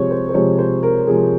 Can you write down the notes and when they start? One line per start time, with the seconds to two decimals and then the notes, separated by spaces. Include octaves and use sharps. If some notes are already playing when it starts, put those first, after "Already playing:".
Already playing: C3 F3 G#3 C5 C#5
0.11 C5
0.29 C5
0.34 C3 F3 G#3 C#5
0.58 C5
0.83 A#4
1.07 C3 F3 G#3 G#4